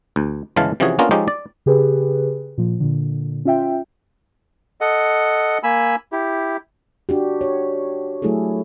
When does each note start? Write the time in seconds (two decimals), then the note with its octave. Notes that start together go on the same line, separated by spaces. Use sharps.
0.16 D2
0.56 G1 C#3 E3 G#3 F5 A5
0.80 C3 E3 F3 C#4 F#4 G#4
0.99 A#3 B3 C#4 D4 F4 A#4
1.11 F3 G#3 C#4 D#4 G4
1.28 D5
1.66 C#3 G4 G#4 B4
2.58 A#2 F3
2.80 A#2 D3
3.45 C#4 F4 E5 G5
4.81 A4 D#5 F#5
5.63 A#3 G#5 B5 E6
6.12 E4 G4
7.09 D4 F#4 G4
7.41 C#5
8.22 F#3 A3 E4 G#4 A4